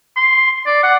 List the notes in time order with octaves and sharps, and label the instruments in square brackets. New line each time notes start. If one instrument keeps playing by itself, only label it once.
[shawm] C6
D5
F#5